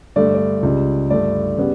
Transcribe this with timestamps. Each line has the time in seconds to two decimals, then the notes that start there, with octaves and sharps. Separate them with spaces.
0.16 G2 D3 A3 D5
0.35 D5
0.63 C#2 C#3 G3
1.10 G2 D3 A3 D5
1.57 C#3 G3 B3